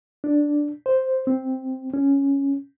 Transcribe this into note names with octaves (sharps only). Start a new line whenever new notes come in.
D4
C5
C4
C#4